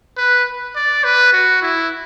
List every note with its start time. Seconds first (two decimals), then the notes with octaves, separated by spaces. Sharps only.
0.17 B4
0.76 D5
1.04 B4
1.33 F#4
1.62 E4